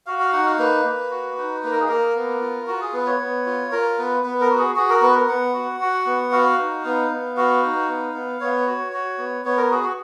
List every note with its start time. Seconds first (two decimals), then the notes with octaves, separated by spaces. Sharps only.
0.06 F#4 F5
0.19 F5
0.33 D#4 F#5
0.45 F5
0.58 A#3 B4
0.85 A#3
1.11 F#4
1.38 D#4
1.63 A#3 B4
1.71 A#4
1.80 G#4
1.88 A#3 A#4
2.15 B3
2.41 F4
2.67 F4 F#4
2.81 G#4
2.93 B3 B4
3.06 C#5
3.20 B3
3.46 F4
3.71 F4 A#4
3.98 B3 B4
4.23 B3 B4
4.41 A#4
4.50 F#4
4.58 G#4
4.75 F#4 G#4
4.89 A#4
5.01 B3 B4
5.15 A#4
5.28 B3 F#5
5.53 F#4
5.80 F#4
6.06 B3
6.32 F#4 F5
6.58 D#4
6.85 B3
7.10 B3
7.37 F#4 F5
7.62 D#4
7.88 B3
8.14 B3
8.40 B3 C#5
8.66 F#4
8.92 F#4
9.18 B3
9.44 B3 C#5
9.57 A#4
9.71 F#4 G#4
9.83 F#4